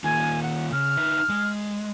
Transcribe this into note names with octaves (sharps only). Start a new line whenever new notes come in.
D#3 A#3 F4 G#5
F#5
C#3 F6
D#4 B4 E5
G#3